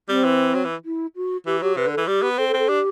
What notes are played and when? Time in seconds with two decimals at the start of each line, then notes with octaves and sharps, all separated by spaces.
0.09 G3 C4
0.24 E3
0.54 F#3
0.65 E3
0.85 E4
1.16 F#4
1.46 E3 G4
1.62 F#3 G4
1.77 C3 B4
1.87 D3
1.92 A4
1.97 E3
2.07 G3 G4
2.23 B3
2.38 C4 A4
2.49 A4
2.54 C4
2.59 A4
2.69 D4 G4